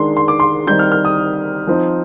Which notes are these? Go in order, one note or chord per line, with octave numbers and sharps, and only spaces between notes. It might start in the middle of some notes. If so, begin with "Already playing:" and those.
Already playing: D#3 G#3 D4 C6
C6
D6
C6
D#3 G3 C4 D#4 G6
F6
F6
D#6
F3 C4 D#4